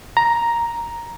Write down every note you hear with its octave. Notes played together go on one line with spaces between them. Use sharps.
A#5